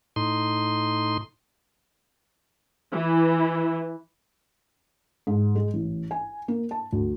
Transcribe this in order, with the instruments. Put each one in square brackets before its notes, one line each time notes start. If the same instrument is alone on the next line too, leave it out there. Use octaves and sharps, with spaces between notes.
[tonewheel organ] A2 D#4 C6
[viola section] E3
[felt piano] G#2
G#3
A1
G#5
A#3
A5
D2